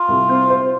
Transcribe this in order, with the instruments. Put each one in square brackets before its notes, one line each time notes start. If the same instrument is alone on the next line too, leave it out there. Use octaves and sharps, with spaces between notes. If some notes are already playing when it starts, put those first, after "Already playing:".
Already playing: [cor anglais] F4
[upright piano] C2
C4
C5